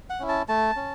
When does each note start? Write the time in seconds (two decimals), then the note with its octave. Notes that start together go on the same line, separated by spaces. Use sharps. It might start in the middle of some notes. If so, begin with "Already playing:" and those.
0.10 F#5
0.20 C#4 E4
0.29 A5
0.48 A3 A5
0.76 C#4